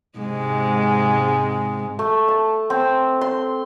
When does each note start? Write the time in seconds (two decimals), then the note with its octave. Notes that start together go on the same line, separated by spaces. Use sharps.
0.19 G#2 C3 G#3
1.99 A3
2.28 A5
2.70 C4
3.21 C6